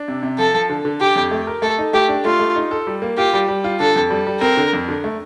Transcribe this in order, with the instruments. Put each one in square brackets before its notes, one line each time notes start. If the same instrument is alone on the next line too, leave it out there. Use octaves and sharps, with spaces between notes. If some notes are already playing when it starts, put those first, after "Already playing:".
Already playing: [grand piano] D4
C3
C3
[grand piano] F3 [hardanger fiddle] A4
[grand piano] F3
D3
D3
[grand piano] D3 [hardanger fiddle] G4
[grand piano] F2
A3
A#4
[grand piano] A3 [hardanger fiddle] A4
[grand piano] D#4
[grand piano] A3 [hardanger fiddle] G4
[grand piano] D4
[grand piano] A3 [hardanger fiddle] F4
[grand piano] A3
D#4
A4
G3
A#3
[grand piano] F4 [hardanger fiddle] G4
[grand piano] G3
G3
F4
[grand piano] D3 [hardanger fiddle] A4
[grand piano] F2
G3
G3
[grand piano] C4 [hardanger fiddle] A#4
[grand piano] D3
F2
D3
A3